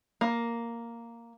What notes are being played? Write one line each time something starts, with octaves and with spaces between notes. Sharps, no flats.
A#3